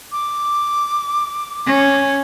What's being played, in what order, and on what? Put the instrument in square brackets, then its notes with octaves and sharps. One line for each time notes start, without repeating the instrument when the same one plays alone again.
[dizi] D6
[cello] C#4